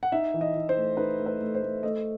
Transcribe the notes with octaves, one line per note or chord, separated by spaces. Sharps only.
F#5
D#4 E5
E3
D#5
E3
C5
A3
D#4 B4
A3
B4
A3
C5
A3
A3 D#5